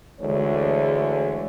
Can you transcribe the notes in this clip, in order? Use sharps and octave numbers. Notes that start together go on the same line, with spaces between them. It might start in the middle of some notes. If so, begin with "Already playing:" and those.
D2 E3 G#3 C#5